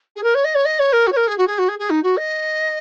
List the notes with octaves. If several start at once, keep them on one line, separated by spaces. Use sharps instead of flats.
G#4
A#4
C#5
D#5
C#5
D#5
C#5
A#4
F#4
C#5
A#4
G#4
F#4
G#4
F#4
G#4
G#4
D#4
F#4
D#5